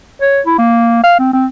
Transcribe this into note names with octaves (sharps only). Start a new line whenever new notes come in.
C#5
E4
A#3
F5
C4
C4